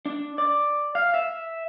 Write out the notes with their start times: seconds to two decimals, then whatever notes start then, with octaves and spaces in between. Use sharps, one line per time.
0.06 D4
0.38 D5
0.95 F5
1.14 E5